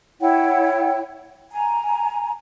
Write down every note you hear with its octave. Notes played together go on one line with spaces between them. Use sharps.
E4 C#5 F#5 G5
G#5 A#5